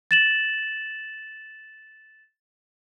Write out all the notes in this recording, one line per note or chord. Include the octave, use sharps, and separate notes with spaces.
A6 E7 F#7